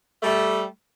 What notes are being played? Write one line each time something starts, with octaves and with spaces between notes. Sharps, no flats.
G3 A3